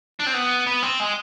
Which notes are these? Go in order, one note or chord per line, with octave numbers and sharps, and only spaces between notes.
D4
C4
B3
B3
C4
G#3